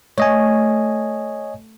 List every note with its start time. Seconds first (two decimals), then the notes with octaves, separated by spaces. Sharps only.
0.18 A3 C#5 D#5 G#5